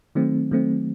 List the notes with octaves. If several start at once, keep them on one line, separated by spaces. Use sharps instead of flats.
D#3 F#3 A3 C4
D#3 F#3 A3 C4